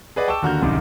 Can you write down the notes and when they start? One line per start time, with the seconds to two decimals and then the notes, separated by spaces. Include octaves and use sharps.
0.16 G#4 B4 D5 D#5 F#5
0.28 G5 A5 C#6 D6 E6 E7
0.42 D#2 D3 F#4 A#5 F6 G6
0.61 D1 C2 F#2 D#3 D6